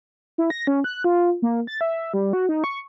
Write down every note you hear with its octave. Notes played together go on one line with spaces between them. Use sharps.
E4
A#6
C#4
F#6
F4
A#3
A6
E5
G3
F#4
D#4
C#6